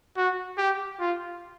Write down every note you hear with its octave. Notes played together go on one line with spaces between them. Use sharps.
F#4
G4
F4